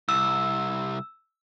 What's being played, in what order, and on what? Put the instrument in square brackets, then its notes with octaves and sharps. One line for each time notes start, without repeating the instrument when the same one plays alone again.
[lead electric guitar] C2 [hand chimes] E6